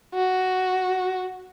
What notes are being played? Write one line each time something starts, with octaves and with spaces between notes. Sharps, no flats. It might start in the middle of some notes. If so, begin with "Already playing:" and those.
F#4